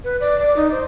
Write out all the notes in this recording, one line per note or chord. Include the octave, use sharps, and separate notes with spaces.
B4
D5
D5
D#4
C5